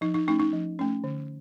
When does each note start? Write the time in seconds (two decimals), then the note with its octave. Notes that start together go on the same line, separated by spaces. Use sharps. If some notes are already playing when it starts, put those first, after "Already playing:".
0.01 F3 D#4
0.14 D#4
0.28 A3 C#4 D#4
0.40 D#4
0.53 F3
0.79 A3 C#4
1.04 D3